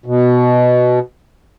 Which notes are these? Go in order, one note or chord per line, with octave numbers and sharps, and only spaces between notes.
B2